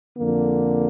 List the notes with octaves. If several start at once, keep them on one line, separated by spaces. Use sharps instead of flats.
F2 D3 A#3